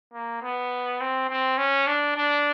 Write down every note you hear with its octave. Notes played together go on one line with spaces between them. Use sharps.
A#3
B3
C4
C4
C#4
D4
D4